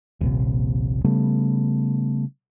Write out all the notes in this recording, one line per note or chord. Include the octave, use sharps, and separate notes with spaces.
D#1 A#1 C3
C#3 G3 A3 B3